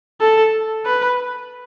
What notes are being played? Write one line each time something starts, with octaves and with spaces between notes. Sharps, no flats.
A4
B4